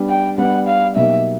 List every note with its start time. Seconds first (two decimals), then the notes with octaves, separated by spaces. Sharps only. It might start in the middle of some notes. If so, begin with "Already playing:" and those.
Already playing: G3 B3 D4 G4
0.09 G5
0.38 G3 B3 D4 F#5
0.67 F5
0.96 B2 F#3 A#3 D#4 G4 E5